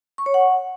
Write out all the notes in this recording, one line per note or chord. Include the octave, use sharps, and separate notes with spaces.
C#6
C#5
F#5